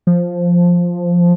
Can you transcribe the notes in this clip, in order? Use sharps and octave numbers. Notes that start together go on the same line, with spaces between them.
F3